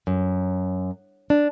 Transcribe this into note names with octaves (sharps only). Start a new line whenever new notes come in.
F#2
D4